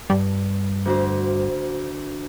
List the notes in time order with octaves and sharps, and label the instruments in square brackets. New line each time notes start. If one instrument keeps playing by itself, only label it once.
[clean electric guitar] G2 [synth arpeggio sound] G3
[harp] D2 F#4 C5